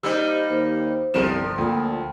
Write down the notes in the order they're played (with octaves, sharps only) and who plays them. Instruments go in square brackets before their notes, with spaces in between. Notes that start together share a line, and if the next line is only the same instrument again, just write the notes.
[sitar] G3 A#3 D#4 [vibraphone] G4 C5 D#5 [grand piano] E6
[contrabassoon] D#2 [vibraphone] C5
[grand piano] G1 C4 E7 [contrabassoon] C2 [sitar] F3 A#4
[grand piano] D2 [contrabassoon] A#2 [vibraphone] G5 B5